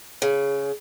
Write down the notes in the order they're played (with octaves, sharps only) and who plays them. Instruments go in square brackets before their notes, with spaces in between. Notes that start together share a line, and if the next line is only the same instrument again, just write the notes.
[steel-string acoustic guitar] C#3